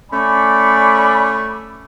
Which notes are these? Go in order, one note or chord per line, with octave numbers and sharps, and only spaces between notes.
A3 C#4 D5 G#5 B5